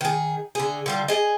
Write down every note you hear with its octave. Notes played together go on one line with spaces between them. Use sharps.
D#3 G#4
D3 G#4
D3 G3 F4
G#4 D#5